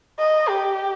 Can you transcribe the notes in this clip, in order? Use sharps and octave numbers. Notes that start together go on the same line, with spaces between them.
D#5
G4